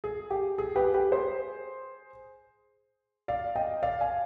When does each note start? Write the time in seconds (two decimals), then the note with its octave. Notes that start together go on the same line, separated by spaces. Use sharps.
0.04 G#4
0.30 G4
0.58 G#4
0.76 G4 B4
0.94 G4 B4
1.12 G#4 C5
3.28 D5 F5
3.56 D#5 G5
3.82 D5 F5
4.01 F5 G#5